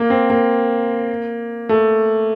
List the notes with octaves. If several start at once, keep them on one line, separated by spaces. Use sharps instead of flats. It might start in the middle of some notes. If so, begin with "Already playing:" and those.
Already playing: A#3
C4
A#3
A3